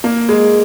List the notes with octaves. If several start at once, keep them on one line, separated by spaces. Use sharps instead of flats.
A#3
G#3